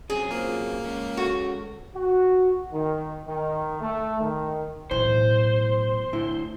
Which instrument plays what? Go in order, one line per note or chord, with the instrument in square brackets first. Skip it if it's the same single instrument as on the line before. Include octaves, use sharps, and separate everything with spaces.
[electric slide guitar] F#3 C4 C#4 [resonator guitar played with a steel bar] G#4
[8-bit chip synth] A#3 [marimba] F4 C5
[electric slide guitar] G#3 C#4
[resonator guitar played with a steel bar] F#4 [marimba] A4 C#6
[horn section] F#4
D#3
D#3
A3
D#3
[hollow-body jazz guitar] B1 E3 [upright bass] A2 [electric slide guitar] C5
[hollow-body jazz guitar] A2 D3 E4